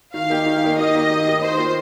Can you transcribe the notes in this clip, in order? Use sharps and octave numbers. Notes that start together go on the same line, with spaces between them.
D#3 F5
A#3 D#4 G4
D#3
A#3 D#4 G4
D#3 D#5
A#3 D#4 G4
D#3
A#3 D#4 G4
D#3 C5
A#3 F4